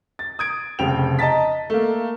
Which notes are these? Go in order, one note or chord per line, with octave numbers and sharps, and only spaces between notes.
A6
D#6 G#6 D7
F1 C#3 C4 G5 F7
D#5 A5 A#5 A6 B6
A3 A#3